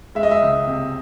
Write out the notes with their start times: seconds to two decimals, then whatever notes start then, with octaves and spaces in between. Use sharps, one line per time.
0.15 G#3 E5
0.23 D#5
0.31 E5
0.42 C#2
0.67 C3